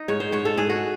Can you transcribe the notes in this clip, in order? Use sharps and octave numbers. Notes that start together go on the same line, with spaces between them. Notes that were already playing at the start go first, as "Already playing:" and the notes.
Already playing: D#4
G#2 C#5
C5
G#2 C#5
A4
G#2 G#4
F#4